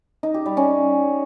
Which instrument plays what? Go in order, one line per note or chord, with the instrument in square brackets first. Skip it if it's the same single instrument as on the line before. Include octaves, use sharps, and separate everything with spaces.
[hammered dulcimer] D#4
G4
G3
C#4